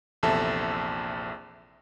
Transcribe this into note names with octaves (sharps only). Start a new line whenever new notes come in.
A#1 E2 C3 A4 E5 A5